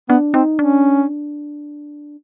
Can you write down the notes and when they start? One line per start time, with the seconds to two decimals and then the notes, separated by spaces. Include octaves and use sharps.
0.09 B3 D4
0.34 C4 D#4
0.59 C#4 D4